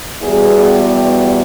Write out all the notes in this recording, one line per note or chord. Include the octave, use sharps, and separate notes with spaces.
E2 B2 G3 G#4
G4